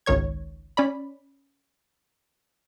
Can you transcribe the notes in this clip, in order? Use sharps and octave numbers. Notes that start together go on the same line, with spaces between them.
G#1 C#2 D#3 C#5 G#6
C#4 D5 B5